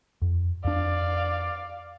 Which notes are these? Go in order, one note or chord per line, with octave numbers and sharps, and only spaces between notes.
F2
F2 D4 D5 F5